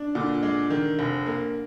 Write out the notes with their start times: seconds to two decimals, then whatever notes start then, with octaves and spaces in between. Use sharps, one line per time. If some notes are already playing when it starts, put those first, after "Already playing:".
Already playing: D4
0.15 A#2 D3
0.43 G#3
0.70 D#3
0.99 F1
1.26 A#3